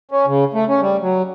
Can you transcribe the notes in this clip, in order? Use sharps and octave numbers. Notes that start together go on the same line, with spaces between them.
C#4
C#3
A3
C#4
G3
F#3